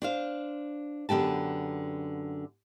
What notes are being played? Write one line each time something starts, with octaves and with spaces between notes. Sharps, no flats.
D4 C5 F5
F#2 D3 B3 G4 A5